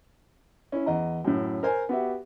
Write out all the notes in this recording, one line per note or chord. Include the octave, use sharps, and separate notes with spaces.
C#4 E4
E2 D#5 A#5
F#2 A2
A#4 C5 G#5
B3 F#4 G4 E5